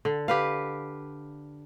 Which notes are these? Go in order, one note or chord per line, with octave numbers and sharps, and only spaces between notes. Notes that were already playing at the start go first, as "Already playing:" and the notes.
D3
G4 B4 F5